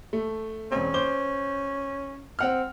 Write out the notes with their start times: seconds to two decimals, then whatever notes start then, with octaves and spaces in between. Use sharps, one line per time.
0.13 A3
0.72 E1 C4 C#4
0.94 C5 D6 G7
2.39 C4 F#5 F6